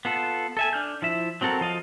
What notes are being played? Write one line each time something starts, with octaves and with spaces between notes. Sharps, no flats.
B3 F4 A4
A4 E5 G#5
D4 F6 G6
F3 E4 E5
F#3 C4 F#4 A4 A#4
F3 D#5 F5